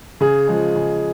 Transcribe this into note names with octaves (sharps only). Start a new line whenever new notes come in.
C#3 G#4
F3 G#3
C#3